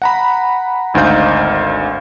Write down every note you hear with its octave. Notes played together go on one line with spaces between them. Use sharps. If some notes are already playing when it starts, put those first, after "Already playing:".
F#5 A#5 B5
G#1 D2 D#4 C5 F5 G6